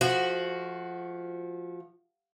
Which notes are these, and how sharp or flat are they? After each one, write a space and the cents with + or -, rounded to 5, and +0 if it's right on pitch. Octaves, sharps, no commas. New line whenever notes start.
F3 +0 A3 -35 F#4 +0